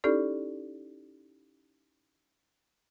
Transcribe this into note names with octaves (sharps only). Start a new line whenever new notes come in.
C#4 D#4 E4 G4 A4 D5